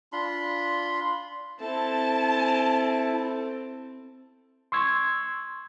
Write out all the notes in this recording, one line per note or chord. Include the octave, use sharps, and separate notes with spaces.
D4 F4 B5 C6
C4 E4 A4 A5
C6 C#6 E6 G#6